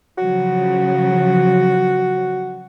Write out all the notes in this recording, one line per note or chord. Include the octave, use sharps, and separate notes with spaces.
C#3 F3 F#3 F#4